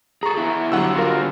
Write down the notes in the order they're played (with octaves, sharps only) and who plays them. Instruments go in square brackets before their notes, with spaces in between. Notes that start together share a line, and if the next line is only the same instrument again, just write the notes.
[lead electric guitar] G#4 A4 [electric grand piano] A#5 C#6
[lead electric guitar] E4 G#4
[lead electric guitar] D3 G4 [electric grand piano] F#3 F#5 E6
[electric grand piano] F4 F#4 A#4